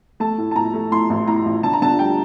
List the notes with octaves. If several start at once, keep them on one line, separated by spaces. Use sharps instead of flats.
A3 A5
A2
A5
A2 A#5
A3
A2 C6
A1
A2 A#5
A1
D3 A5
A#5
D3 A5
G3 G5